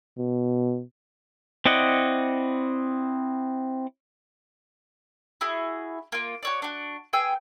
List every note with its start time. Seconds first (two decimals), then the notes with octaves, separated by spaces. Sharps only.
0.19 B2
1.66 C4 E4 D5 D#5 F#5
5.41 E4 F#4 G#4
6.12 A#3 F4
6.43 F#4 C#5 D5
6.62 D4 F#4
7.13 B3 G#4 G5 E6